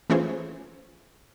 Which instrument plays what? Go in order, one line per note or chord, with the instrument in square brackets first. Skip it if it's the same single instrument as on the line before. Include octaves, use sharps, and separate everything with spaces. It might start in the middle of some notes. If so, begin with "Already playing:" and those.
[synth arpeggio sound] E3 A3 C#4 F4 G#4 C5